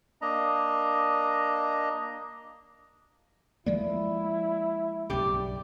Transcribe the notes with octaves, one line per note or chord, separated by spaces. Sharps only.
A#3 D4 D#5 A#5
F3 G#3 A#3 E4 D5
B1 G2 C#3 G4 D5